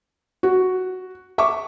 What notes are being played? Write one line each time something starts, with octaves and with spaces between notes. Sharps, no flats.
F#4
E5 C#6 D6